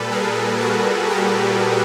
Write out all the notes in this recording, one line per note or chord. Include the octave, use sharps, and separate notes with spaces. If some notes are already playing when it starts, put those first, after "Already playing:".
Already playing: A#2 G3 A4 B4
G#4 A#4
F#4 G#4
G4 A4